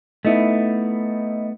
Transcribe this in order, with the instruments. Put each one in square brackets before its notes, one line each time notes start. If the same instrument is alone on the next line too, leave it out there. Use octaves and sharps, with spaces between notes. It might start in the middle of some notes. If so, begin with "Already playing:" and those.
[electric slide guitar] A3 B3 [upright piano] D#4 E4